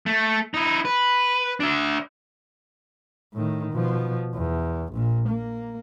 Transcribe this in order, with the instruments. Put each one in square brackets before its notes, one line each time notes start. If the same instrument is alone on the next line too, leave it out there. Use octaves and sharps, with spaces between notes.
[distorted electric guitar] A3
D#4 E4
B4
D4 E5
[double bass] A2 D#3
B2 F3
E2
A#1 A#2
A#3